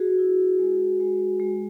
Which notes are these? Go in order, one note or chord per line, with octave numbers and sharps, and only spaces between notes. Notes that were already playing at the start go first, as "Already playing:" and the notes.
Already playing: F#4 G#4
E4
G#3
G#3
G#3